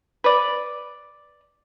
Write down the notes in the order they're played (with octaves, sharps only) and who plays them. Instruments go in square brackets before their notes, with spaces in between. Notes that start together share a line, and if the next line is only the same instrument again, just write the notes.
[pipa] B4 D5